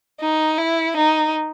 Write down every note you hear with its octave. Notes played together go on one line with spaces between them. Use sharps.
D#4
E4
D#4